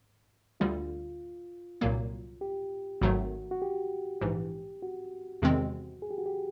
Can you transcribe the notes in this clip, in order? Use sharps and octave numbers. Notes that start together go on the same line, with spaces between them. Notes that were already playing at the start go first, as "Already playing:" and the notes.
D2 D3 G3 F4
C2 A#2 F#3 A#3
G4
G#1 G#2 D#3 F#3 A3 F#4
F#4
G4
A#1 G#2 E3
F#4
E2 C3 D#3 G#3 C4
G#4
G4
F#4
G4